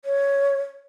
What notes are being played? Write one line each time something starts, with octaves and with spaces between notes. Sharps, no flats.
C#5